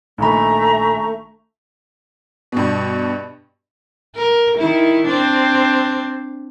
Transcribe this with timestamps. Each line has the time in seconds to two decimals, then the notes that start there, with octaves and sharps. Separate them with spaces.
0.18 A#1 D#3 A3 E5 A#5 B5 C#6
2.52 G2 B2
4.16 A#4
4.58 D#3 E4
5.05 C4 D4